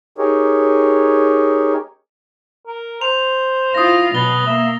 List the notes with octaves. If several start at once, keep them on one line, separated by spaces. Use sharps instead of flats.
D#4 G4 G#4 A#4 C#5
A#4
C5 F7
E4 F4 D#6 A#6
B2 F#3 B4 A6 G7
A#3 E5